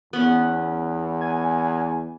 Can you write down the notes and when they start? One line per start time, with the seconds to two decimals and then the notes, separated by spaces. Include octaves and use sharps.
0.13 E2 B3 C#4
1.21 G#5